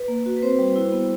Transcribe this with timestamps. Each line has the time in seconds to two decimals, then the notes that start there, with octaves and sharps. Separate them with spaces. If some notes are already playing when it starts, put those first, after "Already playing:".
Already playing: B4
0.08 A#3
0.26 F#4
0.37 B4
0.42 C4 C5
0.59 G3
0.76 E4
0.92 B3